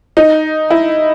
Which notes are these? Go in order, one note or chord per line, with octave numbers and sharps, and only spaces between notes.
D#4
E4